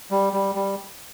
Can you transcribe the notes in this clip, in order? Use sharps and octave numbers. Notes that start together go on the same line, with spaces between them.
G3
G3
G3